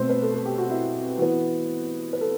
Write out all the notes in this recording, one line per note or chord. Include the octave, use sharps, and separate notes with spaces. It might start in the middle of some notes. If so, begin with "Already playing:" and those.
Already playing: B2 A3 C4 C5
B4
A4
A4
G4
F#4
E4
E3 B3 F#4
B4
A4